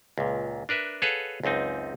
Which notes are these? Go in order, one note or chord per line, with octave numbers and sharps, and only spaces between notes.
C#2 A#2
D4 A#4 B4 E5
G#4 A4 B4 C#5 F5 F#5
C#2 F#2 C4 D#4